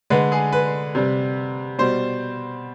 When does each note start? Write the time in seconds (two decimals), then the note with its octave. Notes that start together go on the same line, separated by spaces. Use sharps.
0.10 D3 G#3 B4
0.32 G#4
0.52 B4
0.95 C3 G3
1.79 B2 G3 C5